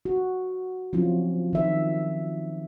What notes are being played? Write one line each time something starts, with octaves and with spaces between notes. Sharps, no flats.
F#4
F3 F#3 C4 C#4 E4 F4
D#3 E5